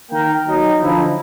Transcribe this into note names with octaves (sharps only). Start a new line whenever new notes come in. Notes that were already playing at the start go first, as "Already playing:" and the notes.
D#3 A#3 A#4 G5
F#3 D#4
D3 F3 D#4 E4